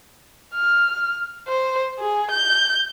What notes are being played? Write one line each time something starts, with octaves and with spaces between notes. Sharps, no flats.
F6
C5
G#4
G6